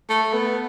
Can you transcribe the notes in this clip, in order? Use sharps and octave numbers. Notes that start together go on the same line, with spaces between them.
A3
B3